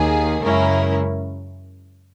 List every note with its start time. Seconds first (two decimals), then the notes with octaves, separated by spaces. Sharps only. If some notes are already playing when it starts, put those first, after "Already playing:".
Already playing: D#2 D#3 A#3 G#4
0.42 F#2 C#3 G#3 C#4 E4 A#4